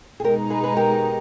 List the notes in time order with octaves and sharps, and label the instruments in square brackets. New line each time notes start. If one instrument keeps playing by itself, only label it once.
[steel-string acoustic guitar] G#4
[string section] B2 G#3 D#4 [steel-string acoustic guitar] G4 A#4
[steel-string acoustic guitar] G#4 B4
G#4 B4
G4 A#4